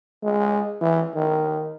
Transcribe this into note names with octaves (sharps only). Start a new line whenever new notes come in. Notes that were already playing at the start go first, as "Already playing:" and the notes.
G#3
E3
D#3